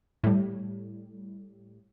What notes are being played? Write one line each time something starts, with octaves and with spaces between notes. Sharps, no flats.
A2 G3